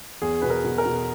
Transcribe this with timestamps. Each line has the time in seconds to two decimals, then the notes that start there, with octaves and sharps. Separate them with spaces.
0.22 E2 G#4
0.42 B2 B4
0.50 A#4
0.64 B2
0.78 A#4
0.86 B2